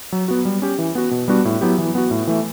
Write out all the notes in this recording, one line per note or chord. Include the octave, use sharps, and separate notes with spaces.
F#3
B3 F#4
G3
C#4 G4
E3
B3 F#4
B2
G3 B3 D4 F#4
A2
F#3 B3 E4 G4
E3
B3 F#4
A2
E3 A3